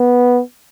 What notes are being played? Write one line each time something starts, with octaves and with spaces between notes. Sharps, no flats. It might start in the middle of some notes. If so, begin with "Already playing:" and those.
Already playing: B3